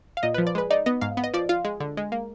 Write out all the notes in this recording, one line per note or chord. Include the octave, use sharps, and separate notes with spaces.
F5
A#2 D#5
B4
F3
D5
G#3 B4
D#4 D5
B3 D#5
G#2 F5
B3
D#5
F3 D5
F4 F5
G#3
D3
G#3
A#3